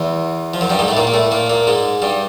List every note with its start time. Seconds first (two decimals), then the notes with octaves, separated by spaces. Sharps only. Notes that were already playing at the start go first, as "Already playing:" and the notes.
Already playing: E2 E3
0.54 F3
0.61 F#2 F#3
0.70 G2 G3
0.79 G#2 G#3
0.88 A2 A3
0.97 A#2 A#3
1.07 A#3
1.14 A2 A3
1.31 A#2 A#3
1.50 A#2 A#3
1.67 G#2 G#3
2.02 G2 G3